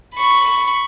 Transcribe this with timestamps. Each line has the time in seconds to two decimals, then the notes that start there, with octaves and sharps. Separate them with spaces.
0.14 B5 C#6